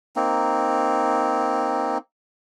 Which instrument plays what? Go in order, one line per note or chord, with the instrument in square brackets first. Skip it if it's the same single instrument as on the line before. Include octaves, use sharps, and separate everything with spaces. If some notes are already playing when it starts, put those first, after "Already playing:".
[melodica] A#3 C4 D#4